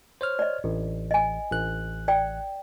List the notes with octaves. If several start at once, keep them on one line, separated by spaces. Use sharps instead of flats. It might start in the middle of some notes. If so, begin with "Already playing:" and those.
C5 C#5 F6
D5 D#5
A1
D#5 G#5
A1 F#6
D5 G5